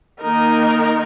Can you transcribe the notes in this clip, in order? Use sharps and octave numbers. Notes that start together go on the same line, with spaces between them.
D#3 A#3 D#4 A#4